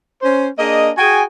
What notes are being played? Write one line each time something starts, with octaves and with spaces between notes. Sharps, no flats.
C#4 C5
A#3 D4 G#4 D#5
F#4 G#4 G5 G#5